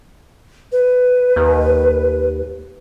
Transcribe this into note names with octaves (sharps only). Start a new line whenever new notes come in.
B4
D#2